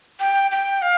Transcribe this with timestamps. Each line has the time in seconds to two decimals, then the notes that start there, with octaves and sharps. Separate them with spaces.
0.20 G5
0.51 G5
0.82 F5